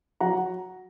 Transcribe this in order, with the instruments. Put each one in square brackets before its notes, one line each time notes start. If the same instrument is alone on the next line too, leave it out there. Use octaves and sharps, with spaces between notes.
[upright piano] F#3 F#5 A#5